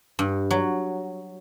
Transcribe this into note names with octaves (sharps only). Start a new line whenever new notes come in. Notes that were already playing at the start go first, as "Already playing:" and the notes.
G2
F#3